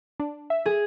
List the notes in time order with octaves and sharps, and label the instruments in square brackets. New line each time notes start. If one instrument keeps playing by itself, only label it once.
[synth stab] D4
E5
[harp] G#4